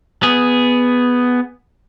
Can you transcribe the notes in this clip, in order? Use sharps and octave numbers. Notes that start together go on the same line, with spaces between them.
B3 G#4